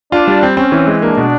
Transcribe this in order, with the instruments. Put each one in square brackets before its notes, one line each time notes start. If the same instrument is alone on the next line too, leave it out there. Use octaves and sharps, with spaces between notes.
[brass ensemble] D4 [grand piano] F4
[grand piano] G3
C4
[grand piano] C4 [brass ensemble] C#4
[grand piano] E3
G#3
[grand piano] A#3 [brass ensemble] D4
[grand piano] B2